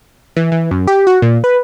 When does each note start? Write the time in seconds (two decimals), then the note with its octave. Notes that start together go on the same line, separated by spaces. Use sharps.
0.36 E3
0.52 E3
0.71 F#2
0.87 G4
1.07 F#4
1.22 A#2
1.44 B4